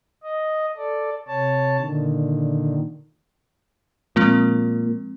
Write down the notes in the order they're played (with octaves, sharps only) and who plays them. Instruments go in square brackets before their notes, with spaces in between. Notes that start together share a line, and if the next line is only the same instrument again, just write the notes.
[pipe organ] D#5
A4 D5
C3 C#5 A5
A#2 D3 D#3
[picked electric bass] A#2 [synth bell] F3 G#3 C4